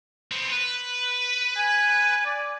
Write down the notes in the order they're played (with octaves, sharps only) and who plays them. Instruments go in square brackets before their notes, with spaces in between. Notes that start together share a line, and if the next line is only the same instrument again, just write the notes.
[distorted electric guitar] B3 C4
B4
[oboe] G#5
D5